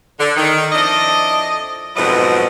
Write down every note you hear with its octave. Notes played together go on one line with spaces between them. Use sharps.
D3
D#3
F2 D4 E4 D#5
F2 G#2 B2 F#3 E4 D#5